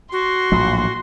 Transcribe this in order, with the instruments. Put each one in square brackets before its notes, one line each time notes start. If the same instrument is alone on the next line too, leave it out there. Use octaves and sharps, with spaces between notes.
[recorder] F#4 [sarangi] C6
[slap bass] A#1 A2 F#3